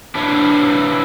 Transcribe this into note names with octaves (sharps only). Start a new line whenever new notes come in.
D4 E4 B4 C#5